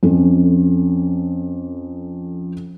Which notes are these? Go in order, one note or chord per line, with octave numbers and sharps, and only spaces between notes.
F2 C#4 A4